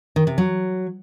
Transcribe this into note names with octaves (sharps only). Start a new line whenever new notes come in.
D#3
C3
F#3